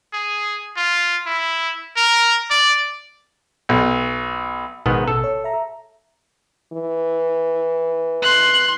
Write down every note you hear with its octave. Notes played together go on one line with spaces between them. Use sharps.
G#4
F4
E4
A#4
D5
B1
A1 G#2 B2 D#3 B3
A4
C#5
E5 A#5
E3
C6 F#6